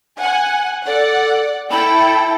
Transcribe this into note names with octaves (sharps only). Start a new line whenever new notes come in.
F#5 G#5
A4 D5 F#5
E4 A4 G5 B5